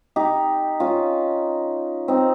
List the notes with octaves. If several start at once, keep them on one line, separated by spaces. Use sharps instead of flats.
D#4 G4
C#4 F4
C4 D#4